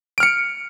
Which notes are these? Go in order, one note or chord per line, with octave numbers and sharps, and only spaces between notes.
F6 C#7 D7